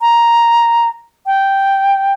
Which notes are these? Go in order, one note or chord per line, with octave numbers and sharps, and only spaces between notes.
A#5
G5